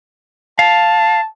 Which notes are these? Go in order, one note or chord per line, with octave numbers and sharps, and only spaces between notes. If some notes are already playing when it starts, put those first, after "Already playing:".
F5 A5